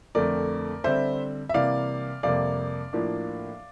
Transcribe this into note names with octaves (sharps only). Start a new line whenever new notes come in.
F2 D3 A3 C4 A#4 D5
D3 G3 C4 C5 E5
E5
C3 E3 G3 A#3 D5 F5
F2 C3 G3 A#3 D5 F5
A2 F3 A#3 D4